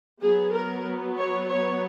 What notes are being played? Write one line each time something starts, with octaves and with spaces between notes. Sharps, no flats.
F#3 B3 G#4
A#4
C#5
C#5